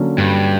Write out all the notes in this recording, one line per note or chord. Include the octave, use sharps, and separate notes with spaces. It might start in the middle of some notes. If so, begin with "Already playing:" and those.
Already playing: D3 F#3 A#3 C#4
G2